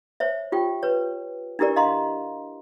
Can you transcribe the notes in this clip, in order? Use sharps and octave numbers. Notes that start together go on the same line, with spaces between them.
C5 C#5 E5
F4 G4 G5
B4 C#5
D4 E4 G4 A#4 D5
D#5 F5 A#5 C6